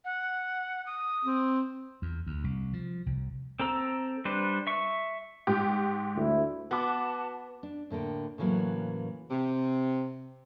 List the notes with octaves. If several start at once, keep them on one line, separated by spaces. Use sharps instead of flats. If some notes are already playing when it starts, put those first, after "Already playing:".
F#5
D#6
C4
E2
D2
C2
F3
C2
C4 A4 A#5 E6
G3 D4 B4 C5
E5 C#6
G#2 G4
D2 E4
B3 F#4 B4 A5 D6
D4
A2 D3 A#3 G5
A2 C#3 E3 F#3 A#3
C3